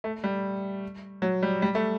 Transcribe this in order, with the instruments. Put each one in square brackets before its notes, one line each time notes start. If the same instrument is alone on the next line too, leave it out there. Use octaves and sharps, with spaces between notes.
[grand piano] A3
G3
F#3
G3
G3
A3